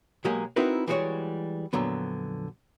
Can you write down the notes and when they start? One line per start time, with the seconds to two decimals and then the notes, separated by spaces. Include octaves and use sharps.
0.25 B1 F#3 G#3 A#3 G4 G#4
0.56 C4 D#4 E4 F#4 A#4 B4
0.87 E3 G3 G#3 F#4 C#5
1.73 F2 A#2 D3 F#3 B3